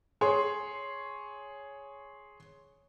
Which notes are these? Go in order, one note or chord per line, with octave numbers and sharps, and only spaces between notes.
G#4 C#5 C6